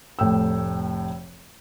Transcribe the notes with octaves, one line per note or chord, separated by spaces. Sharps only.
F1 A2 G5 E6